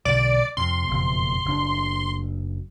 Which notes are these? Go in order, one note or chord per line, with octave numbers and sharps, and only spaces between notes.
B1 D3 D5
F2 C3 C6
F#1 F2 B2
F#1 D4